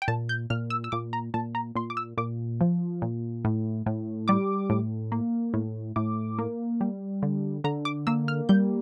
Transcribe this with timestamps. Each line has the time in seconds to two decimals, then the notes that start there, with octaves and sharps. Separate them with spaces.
0.02 G5
0.08 A#2 A5
0.29 G6
0.50 A#2 F6
0.70 E6
0.84 E6
0.92 A#2 D6
1.13 A#5
1.34 A#2 A5
1.55 A#5
1.75 A#2 C6
1.90 D6
1.97 E6
2.17 A#2 D6
2.61 F3
3.02 A#2
3.45 A2
3.86 A2
4.28 G3 D6
4.70 A2
5.12 A#3
5.54 A2
5.96 A2 D6
6.39 A#3
6.81 G3
7.22 D3
7.64 D3 A#5
7.85 D6
8.07 A#3 E6
8.28 F6
8.49 G3 G6